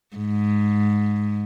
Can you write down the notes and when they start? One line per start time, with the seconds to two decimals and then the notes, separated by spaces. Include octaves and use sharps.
0.16 G#2